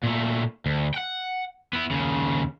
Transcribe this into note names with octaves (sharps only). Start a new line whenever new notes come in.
A#2 A3
D2
F#5 G5
B3 E4
D#2 C#3